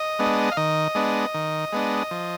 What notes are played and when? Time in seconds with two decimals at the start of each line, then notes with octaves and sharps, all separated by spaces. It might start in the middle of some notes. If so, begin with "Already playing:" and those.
Already playing: D#5
0.19 G#3 B3 D4
0.52 F5
0.57 D#3 D#5
0.95 G#3 B3 D4
1.34 D#3
1.72 G#3 B3 D4
2.11 F3